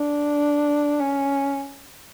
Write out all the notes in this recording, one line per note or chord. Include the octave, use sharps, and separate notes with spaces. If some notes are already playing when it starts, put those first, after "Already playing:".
Already playing: D4
C#4